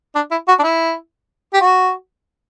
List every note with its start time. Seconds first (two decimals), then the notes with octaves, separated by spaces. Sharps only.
0.15 D4
0.31 E4
0.48 F#4
0.59 D4
0.63 E4
1.54 G4
1.61 F#4